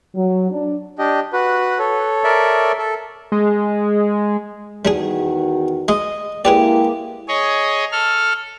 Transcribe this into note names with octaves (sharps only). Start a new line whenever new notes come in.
F#3
D4
D4 G4 D#5
F#4 B4
A4 C#5
A#4 D5 E5
A4
G#3
E2 D#3 G3 D4 F#4 G#4
G#3 D#5
G#3 A#3 E4 G4 G#4 B4 D5
G#4 C#5 D#5
A4 F6